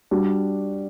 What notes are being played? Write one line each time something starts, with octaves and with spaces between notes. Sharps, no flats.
G3 D4 F#4